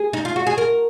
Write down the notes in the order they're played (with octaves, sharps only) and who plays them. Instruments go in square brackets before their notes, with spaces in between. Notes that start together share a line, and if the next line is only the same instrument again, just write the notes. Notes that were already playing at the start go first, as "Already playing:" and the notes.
Already playing: [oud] G#4
D#4
F4
F#4
G#4
A#4